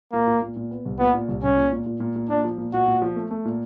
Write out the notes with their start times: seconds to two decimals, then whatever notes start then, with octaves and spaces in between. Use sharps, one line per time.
0.13 A#2 A#3
0.27 A#2
0.42 A#2
0.57 A#2
0.71 B3
0.86 C2
0.99 A#2 B3
1.14 A#2
1.29 C2
1.43 C2 C#4
1.57 A#2
1.72 A#2
1.86 A#2
2.00 A#2
2.16 A#2
2.29 A#2 D4
2.44 F3
2.58 A#2
2.73 A#2 F#4
2.88 A#2
3.02 F3
3.16 A3
3.31 A3
3.45 A#2